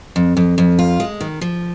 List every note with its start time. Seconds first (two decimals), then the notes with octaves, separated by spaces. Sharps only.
0.16 F2
0.37 F2
0.58 F2
0.79 F4
1.00 G#3
1.21 D#3
1.41 F3